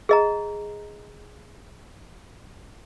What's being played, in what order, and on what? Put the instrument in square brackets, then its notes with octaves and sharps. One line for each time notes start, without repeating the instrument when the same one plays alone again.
[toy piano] G#4 D#5 A#5